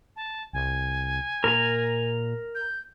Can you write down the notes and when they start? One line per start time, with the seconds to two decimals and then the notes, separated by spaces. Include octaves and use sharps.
0.16 A5
0.53 C2 G#5
1.44 A#2 A#4 A#5
2.55 G6